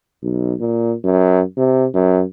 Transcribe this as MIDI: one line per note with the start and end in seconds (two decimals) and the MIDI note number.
0.23 0.54 35
0.60 0.94 46
1.04 1.42 42
1.57 1.86 48
1.94 2.23 42